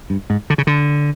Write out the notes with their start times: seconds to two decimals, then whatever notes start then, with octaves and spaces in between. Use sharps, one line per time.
0.10 G2
0.30 G#2
0.50 D3
0.58 C#3
0.67 D3